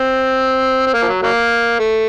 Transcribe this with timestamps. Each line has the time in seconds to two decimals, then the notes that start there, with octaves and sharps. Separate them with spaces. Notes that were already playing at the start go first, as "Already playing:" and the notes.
Already playing: C4
0.87 C4
0.93 A#3
1.02 F3
1.08 F#3
1.23 F#3 A#3
1.79 A3